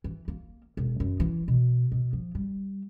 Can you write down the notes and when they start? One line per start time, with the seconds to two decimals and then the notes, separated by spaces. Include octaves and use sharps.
0.04 E3
0.28 A#3
0.77 E1
1.00 F#2
1.20 E3
1.48 B2
1.92 B2
2.13 F3
2.35 G3